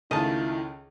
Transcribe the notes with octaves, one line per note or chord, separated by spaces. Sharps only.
C#2 D#3 A3 E4 F4 D#5 A5